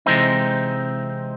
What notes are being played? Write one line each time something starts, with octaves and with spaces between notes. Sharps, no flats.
C3 E3 G#3 C4 D#4